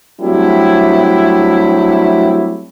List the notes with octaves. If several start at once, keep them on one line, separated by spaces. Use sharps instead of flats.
F#3 G3 A3 C4 D4 E4